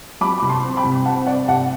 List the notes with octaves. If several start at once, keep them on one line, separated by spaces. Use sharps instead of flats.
F#3 B5 D6
C2 B5
A5 C6
C4
G5 B5
C2
C4 F#5 A5
C4 D5 F#5
C2 F#5 A5